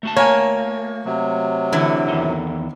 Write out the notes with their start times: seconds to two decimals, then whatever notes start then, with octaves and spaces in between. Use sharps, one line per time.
0.03 A3 F#4 A5
0.16 A#3 C#5 G#5
1.05 C3 F#3
1.72 D3 E3 E4
2.08 E2 D#3